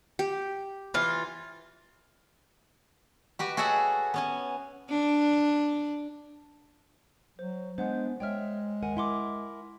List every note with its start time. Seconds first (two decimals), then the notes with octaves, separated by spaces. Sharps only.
0.19 G4
0.94 E3 F4
3.39 F#4 G4 B4
3.57 F#4 G#4 A4 C#5 E5 F#5
4.14 B3 C#4 G#5
4.90 D4
7.39 F#3 C5
7.78 E3 G#3 B3 D4 C5 F#5 G6
8.20 G#3 C#5 D5 E5 G5 F6
8.83 D#2 A#4 F#5 G#5
8.97 E4 A#4 F#5 C6 D6